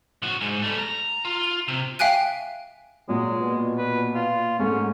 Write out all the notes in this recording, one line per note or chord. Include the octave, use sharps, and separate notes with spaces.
A2 F#4
G#2
G3 A3
A#5
F4
C3
E5 F5 G5 G#5 F#6 D#7
A#2 F#3 G#3
B2
B4
F4
G#2 A3 A#3 C#4